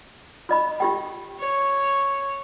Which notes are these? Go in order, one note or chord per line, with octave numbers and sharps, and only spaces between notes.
F4 D#5 B5
F4 G4 G5
C#5